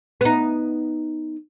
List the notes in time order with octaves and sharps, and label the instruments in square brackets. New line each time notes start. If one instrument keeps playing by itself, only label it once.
[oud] B3 D#4